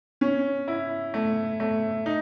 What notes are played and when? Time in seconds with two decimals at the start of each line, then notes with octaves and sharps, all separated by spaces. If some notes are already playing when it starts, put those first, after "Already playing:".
0.21 C#4
0.68 E4
1.14 A3
1.60 A3
2.06 D#4